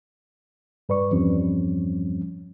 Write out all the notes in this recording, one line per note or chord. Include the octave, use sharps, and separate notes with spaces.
G2 B4 D5 C#6
E2 G2 F3 G3 C4 C#4